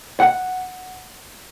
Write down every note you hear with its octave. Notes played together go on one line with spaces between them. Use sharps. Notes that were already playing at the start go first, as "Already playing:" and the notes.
F#5